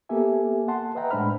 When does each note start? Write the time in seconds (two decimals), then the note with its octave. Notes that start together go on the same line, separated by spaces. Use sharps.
0.09 A#3 B3 G4 A4 E5 G#5
0.68 F#5 A5 C6
0.95 B4 D#5 E5 F#5 G5 A#5
1.11 A2 G#3 D4 C5 B5 F6